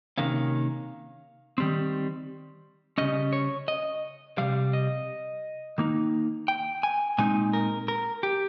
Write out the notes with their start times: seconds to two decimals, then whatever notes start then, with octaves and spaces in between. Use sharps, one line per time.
0.18 C3 D#3 A#3 C#4 F5
1.58 D#3 G3 C4
2.98 C#3 G3 C#4 D#5
3.33 C#5
3.68 D#5
4.38 C3 D#3 G3 F5
4.73 D#5
5.78 D#3 A#3 D#4
6.48 G5
6.83 G#5
7.18 A#2 G#3 C4 D#4 G#5
7.53 A#4
7.88 A#4
8.23 G4